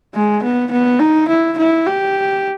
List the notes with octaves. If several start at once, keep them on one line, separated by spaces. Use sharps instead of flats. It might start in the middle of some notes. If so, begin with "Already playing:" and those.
G#3
B3
B3
D#4
E4
E4
G4